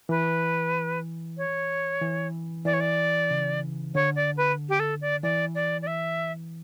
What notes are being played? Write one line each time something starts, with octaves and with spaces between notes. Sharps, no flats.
E3 B4
C#5
E3
E3 D5
C#5
D5
C#3
D3 C#5
D5
B4
G4
A4
D5
E3 D5
D5
D5
E5